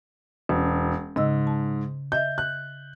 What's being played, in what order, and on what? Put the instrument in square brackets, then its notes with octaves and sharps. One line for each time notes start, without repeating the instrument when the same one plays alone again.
[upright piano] E1 [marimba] C#4
[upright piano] G#2 [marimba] C#3 D#5 E6
[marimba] A5
[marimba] D#5 E5 [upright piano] G6
[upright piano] F#6